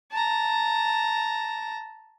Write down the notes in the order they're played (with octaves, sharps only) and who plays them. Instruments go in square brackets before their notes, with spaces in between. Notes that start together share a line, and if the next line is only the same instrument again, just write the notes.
[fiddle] A5 A#5